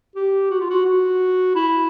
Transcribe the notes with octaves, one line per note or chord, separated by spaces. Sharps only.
G4
F#4
F4
F#4
F#4
E4